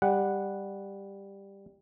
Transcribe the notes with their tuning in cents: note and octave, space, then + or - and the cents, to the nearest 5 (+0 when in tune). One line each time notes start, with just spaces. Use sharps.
G3 +10 F#5 +0